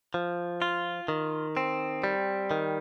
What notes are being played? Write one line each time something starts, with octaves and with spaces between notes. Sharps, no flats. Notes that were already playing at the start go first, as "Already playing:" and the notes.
F3
F4
D#3
C4
G3
D#3